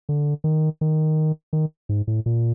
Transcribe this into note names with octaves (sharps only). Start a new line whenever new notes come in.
D3
D#3
D#3
D#3
G#2
A2
A#2